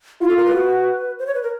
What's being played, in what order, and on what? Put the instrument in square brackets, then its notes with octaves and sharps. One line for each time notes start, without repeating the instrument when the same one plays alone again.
[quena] E4 [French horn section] F4
[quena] A4
A#4
B4
[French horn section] F#4
[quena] C5
C#5
B4
A#4